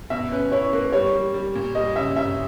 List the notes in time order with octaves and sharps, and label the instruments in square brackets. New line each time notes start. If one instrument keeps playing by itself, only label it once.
[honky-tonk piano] B2 [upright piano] E5
[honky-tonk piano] C#4 [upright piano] B4
[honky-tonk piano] E4 [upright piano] C#5
[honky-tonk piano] A#3 [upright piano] B4
[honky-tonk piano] G3 [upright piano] C#5
[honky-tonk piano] G3
G3
A#2
[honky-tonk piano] G3 [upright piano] D#5
[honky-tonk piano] C#3 [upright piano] E5
[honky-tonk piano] C#3 [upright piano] E5